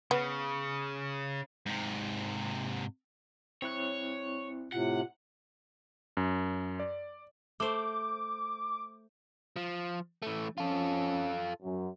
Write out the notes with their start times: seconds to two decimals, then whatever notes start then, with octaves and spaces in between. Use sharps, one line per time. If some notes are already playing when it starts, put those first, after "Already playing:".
0.11 C#3 B3
1.66 G#2 C3
3.62 C4 E4 C#5 F#6
4.72 A2 C3 F4 F#5
6.17 F#2
6.80 D5
7.60 A3 C5 D6
9.56 F3
10.22 E3 A3
10.58 F3 C#4 F4 A4
11.62 F#2